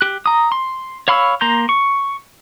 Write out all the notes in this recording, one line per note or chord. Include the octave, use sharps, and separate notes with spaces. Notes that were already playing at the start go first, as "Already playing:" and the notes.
G4 F#6
A#5 D#6
C6
C#5 F5 B5 C#6 E6
A#3 A#5 C6 G6
C#6